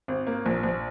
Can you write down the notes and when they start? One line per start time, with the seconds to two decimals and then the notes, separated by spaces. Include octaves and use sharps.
0.08 G#1
0.27 A#3
0.46 A#1
0.63 A#1